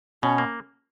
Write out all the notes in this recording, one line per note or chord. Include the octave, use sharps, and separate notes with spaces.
B2 C#4
A#3